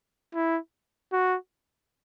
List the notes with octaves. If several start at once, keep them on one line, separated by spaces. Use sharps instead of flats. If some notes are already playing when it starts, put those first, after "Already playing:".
E4
F#4